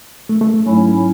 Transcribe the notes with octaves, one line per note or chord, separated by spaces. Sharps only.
A3
A3
A3
G#2 F#3 A3 C#4 E4